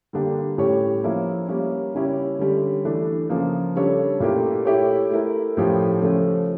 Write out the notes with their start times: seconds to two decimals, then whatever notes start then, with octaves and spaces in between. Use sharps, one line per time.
0.13 D3 G3 A#3 D4 G4
0.58 A2 G3 C#4 G4 C#5
1.04 F3 A#3 C#4 E4
1.48 G3 A#3 C#4
1.94 C#3 G3 C#4 E4 G4
2.39 D3 G3 C#4
2.85 E3 A3 D4
3.30 C#3 F3 A#3
3.75 C#3 G3 D4 A4 C#5
4.20 A#2 A3 E4 G4 A#4
4.65 A3 E4 G4 C#5
5.11 A3 E4 A#4
5.57 A2 F3 C#4 G4
6.01 C#3 F3 A3 C#4